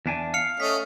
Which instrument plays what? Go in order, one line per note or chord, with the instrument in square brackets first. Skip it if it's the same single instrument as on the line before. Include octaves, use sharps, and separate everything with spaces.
[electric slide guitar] E2 D4 G#5
[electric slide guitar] F5 [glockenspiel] F6 C#7 F7
[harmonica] A3 C#4 D#5 [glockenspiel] B6